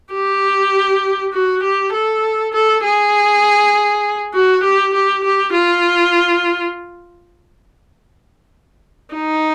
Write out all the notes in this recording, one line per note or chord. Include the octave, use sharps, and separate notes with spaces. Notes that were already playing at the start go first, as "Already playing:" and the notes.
G4
F#4
G4
A4
A4
G#4
F#4
G4
G4
G4
F4
D#4